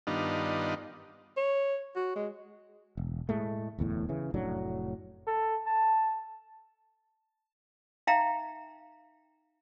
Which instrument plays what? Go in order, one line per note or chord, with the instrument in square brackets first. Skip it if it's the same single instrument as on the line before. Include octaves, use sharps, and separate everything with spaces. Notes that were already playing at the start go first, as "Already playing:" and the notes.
[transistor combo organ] G2 D#3 B3 D4 D#4 F4
[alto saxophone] C#5
F#4
G#3
[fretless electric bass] E1
A2 G#3 A3
D1 E2 A2
C#3 E3
F1 A2 F#3 D4
[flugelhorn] A4
A5
[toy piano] D#4 E5 F5 G5 A#5